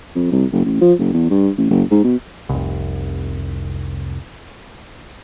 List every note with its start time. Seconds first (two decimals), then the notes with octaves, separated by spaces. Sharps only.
0.16 F2
0.32 C2
0.52 F#1
0.65 A1
0.81 F3
0.99 F#1
1.14 E2
1.30 G2
1.58 A1
1.70 F#1
1.91 G#2
2.04 B2
2.49 F1 C2